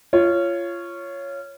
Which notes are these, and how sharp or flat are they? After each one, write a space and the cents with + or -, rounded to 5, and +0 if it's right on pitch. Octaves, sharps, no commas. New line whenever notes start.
F4 -20 C#5 +0